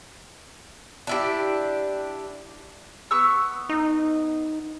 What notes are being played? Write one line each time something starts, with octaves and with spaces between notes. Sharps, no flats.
D4 E4 G4
B3 C#6 E6
D#4